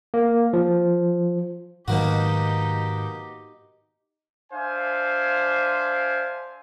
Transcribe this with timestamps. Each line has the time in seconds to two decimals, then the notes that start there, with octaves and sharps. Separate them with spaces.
0.14 A#3
0.53 F3
1.88 G#2 B2 D#3 F#3 A#3 D#4 F#4 G4
4.53 D4 C5 E5 F5 G#5